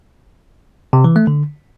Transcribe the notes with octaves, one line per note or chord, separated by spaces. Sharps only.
C3
E3
A3
D3